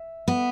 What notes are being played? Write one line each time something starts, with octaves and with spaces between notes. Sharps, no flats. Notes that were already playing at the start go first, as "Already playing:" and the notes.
Already playing: E5
B3